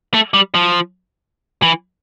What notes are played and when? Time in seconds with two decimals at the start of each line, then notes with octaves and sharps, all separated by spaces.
0.14 A3
0.34 G3
0.55 F3
1.63 E3